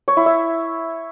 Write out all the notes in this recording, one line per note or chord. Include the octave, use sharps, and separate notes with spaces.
C#5
E4
E5